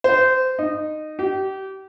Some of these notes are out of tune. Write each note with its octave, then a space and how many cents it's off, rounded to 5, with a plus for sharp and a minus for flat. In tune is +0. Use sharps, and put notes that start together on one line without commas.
C5 -20
D#4 -15
G4 -30